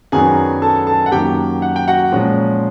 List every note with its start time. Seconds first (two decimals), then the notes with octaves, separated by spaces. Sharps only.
0.12 F#2 D#3 F#3 B3 D4 G#4 G#5
0.62 A4 A5
0.87 A4 A5
1.06 F#5
1.12 F#2 D#3 F#3 A#3 G4 G5
1.62 F#5
1.76 G5
1.88 F#4 F#5
2.12 A#2 F3 G#3 C#4